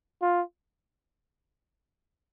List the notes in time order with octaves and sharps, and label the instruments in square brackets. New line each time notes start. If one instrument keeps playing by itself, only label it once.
[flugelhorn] F4